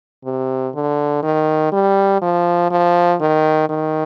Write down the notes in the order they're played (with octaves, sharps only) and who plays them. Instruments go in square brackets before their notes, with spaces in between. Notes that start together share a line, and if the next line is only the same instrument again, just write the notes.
[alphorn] C3
D3
D#3
G3
F3
F3
D#3
D#3